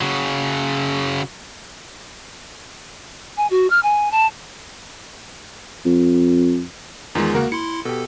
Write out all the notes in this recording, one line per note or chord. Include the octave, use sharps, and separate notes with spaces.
C#3 F#3
G#5
F#4
F6
G#5
A5
F2
E2 D#3 G#3 D#4 F4
C#3 A#3 F#4 A#4
E4 C6 C#7
B2 G4 A4